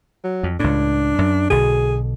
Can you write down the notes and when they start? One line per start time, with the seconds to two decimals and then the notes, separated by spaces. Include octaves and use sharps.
0.24 F#3
0.43 F2
0.60 C#2 A2 D4
1.19 F#2
1.50 B1 B2 D3 G#4